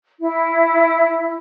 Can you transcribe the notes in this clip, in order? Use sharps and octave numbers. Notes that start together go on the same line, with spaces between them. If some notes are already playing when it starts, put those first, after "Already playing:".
E4